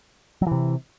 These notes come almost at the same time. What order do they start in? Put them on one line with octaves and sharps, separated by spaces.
F#3 E3 C3